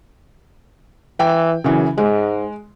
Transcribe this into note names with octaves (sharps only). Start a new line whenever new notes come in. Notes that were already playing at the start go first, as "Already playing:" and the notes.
E3 G5
F#2 C#3 E3
G#2 G#3